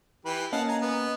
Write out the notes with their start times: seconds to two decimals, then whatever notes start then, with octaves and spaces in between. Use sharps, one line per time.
0.25 E3 G4 B4
0.52 A#3 C#4 D#5 F5 F#5 A5
0.68 G#5 A#5
0.81 B3